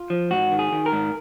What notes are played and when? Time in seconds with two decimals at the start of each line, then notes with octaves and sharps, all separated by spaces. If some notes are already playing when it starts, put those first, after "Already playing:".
Already playing: F4
0.10 F3
0.31 G#2 F#4
0.51 D#3
0.59 G#4
0.72 D#3
0.86 A#4
0.92 G#2